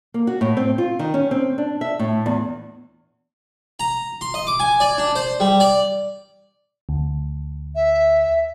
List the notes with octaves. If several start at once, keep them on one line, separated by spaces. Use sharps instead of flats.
A#3
F#4
A2
C4
F4
D#3
C#4
C4
D4
E5
A2
E2
A#5
C6
D#5
D6
G#5
D5
D4
C5
G3
D5
D2
E5